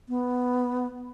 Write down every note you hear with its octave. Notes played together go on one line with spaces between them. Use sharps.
B3